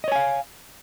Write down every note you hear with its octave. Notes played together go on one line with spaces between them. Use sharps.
C#5 D#5 F5 G#5